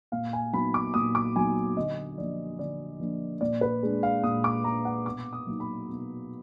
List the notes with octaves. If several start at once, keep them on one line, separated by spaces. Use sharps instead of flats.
A#2 F5
G#5
F#3 B3 D#4 B5
D6
A#2 D#6
D6
F#3 B3 D#4 G#5
D3 D#5
F3 A#3 D4 D5
D3 D5
F3 A#3 D4
A#2 D5
B4
G#3 D4
F5
A#2 D#6
D6
G#3 D4 A#5
F#5
B2 D6
D#6
F#3 A#3 D#4
B5
B2